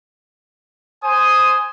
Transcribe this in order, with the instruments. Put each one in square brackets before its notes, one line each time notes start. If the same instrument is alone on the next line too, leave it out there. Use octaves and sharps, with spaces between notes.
[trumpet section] C5 G#5 D#6